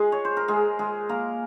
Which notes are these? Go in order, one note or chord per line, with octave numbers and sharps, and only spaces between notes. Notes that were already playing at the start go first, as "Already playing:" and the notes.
Already playing: G#3 G#4
C#5
C5
A#4
G#3 G#4
G#3 G#4
A#3 A#4